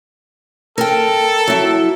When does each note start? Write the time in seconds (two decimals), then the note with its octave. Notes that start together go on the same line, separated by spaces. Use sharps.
0.78 A4 A#4 G5
1.48 F#3 E4